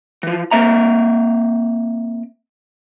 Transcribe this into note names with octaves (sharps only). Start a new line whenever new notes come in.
E3 F3
A#3 C4 E5 A#5